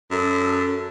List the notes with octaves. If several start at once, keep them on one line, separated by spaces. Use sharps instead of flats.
F#2 A4